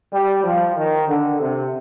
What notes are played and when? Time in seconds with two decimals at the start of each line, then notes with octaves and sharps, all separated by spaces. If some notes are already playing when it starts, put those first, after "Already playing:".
0.12 G3
0.44 F3
0.76 D#3
1.08 D3
1.40 C3